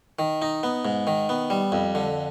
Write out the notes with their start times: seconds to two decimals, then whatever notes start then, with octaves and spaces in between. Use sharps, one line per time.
0.19 D#3
0.42 D#4
0.63 B3
0.85 G#2
1.07 D#3
1.29 B3
1.50 G3
1.72 F2
1.95 D3